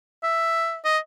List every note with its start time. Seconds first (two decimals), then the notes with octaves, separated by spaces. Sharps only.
0.23 E5
0.84 D#5